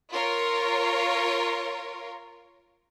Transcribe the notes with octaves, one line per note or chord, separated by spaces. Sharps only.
F4 A#4 C#5